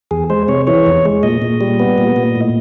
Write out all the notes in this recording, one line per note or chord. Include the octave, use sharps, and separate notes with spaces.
E2 G#4
G#3 C5
C3 C#5
E3 C#5
E2
G#3
A#2 D#5
A#2
G3
B3
A#2
A#2
A2